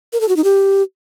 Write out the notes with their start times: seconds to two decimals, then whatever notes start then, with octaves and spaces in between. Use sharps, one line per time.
0.13 A#4
0.21 A4
0.29 F#4
0.36 D#4
0.44 G4